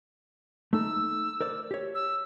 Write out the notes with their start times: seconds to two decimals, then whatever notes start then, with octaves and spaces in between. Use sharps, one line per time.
0.73 A3 D#4 A4 E6
1.41 A#4 C5 D5
1.71 G4 C#5
1.95 E6